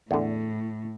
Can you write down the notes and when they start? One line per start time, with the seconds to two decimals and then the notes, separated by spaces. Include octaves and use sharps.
0.11 E2 A2 D3